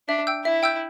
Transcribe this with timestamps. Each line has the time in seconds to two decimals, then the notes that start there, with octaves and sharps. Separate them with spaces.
0.08 D4 E5
0.27 G5 E6 G6
0.44 E4 E5
0.63 G5 E6 G6